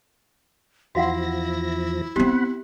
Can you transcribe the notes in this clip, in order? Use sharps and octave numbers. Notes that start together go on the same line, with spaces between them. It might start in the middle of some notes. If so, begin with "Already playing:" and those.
E2 F3 E4 F#4 F5 F#5 A#6
B3 C4 G4 F#5 B5